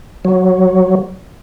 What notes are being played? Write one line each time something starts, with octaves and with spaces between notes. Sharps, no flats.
F#3